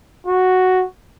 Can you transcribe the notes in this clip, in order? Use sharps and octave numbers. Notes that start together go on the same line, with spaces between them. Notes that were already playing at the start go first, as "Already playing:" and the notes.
F#4